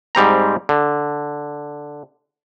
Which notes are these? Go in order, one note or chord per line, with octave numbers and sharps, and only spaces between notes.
G#2 G3 C4 A#5
D3